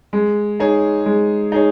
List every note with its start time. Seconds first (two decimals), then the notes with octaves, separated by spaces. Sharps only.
0.13 G#3
0.60 D#4 G#4 C#5
1.06 G#3
1.52 D#4 G#4 C#5